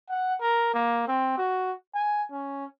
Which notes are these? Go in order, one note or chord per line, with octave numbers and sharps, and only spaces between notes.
F#5
A#4
A#3
C4
F#4
G#5
C#4